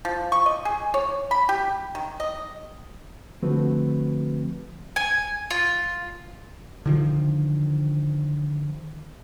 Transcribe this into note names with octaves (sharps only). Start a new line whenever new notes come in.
F3
C#6
D#5
G#4
C#5
B5
G4
D#3
D#5
D3 F3 A3 C4 F#4 B4
G#5
F4
D3 D#3 F3